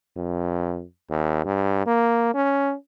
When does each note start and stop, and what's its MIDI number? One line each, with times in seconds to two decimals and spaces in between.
0.17 0.84 41
1.10 1.44 39
1.45 1.85 43
1.86 2.32 58
2.34 2.74 61